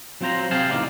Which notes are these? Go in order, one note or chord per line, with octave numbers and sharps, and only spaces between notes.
F#3 C4 F4 C5 A#5
C3 G#4 F5 G5 A5 C6
E2 A2 D#4 D5 F5